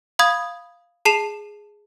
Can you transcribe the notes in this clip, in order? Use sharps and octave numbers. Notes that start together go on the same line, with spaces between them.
F5 B5 D#6 G#6
G#4 A5 C7 E7 F7